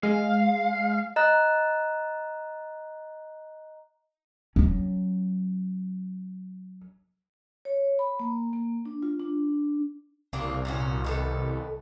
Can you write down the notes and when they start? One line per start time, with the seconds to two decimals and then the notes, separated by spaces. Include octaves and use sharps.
0.03 G#3 F5
1.16 D#5 A#5 F#6
4.56 F#3 C#4
7.65 C#5
7.99 B5
8.20 A#3
8.53 A#3
8.85 D4
9.03 F4
9.20 D4
10.33 C2 C#3 A#3 D4
10.65 A#2 C#4 F#4
11.04 D#3 B3 A4